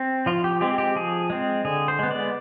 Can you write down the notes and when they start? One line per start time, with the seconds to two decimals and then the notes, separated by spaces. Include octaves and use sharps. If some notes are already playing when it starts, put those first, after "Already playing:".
Already playing: C4
0.26 F3 F4
0.44 G4
0.61 G#3 C4 G4
0.78 G4
0.96 F3 G#4
1.30 G#3 C4
1.65 D3 G#4
1.88 C5
1.99 G#3 B3
2.11 D5